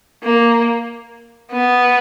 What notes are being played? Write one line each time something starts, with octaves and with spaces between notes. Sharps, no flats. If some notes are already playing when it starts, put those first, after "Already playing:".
A#3
B3